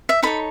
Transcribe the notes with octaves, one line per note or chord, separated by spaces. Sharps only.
E5
D#4 A4 C#5 B5